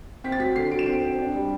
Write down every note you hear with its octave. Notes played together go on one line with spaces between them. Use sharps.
C4 B6
A6
F#3 B6
D3 C7
F#3 D7
E7
C4 D7
C4
D4
G3